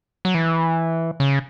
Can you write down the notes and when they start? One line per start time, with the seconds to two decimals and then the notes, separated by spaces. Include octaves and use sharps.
0.25 F#3
0.35 E3
1.20 C#3